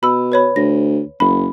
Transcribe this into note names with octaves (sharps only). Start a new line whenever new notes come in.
B2 B5 E6
B4 C#5 B5
D2 A#6
F#1 B5